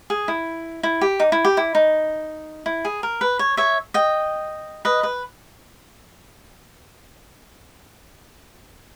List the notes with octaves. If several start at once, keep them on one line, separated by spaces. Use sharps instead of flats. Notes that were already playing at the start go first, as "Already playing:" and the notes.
G#4
E4
E4
G4
D#4
E4
G4
E4
D#4
E4
G#4
A#4
B4
C#5
C#5 E5
D#5 G5
B4 D#5
B4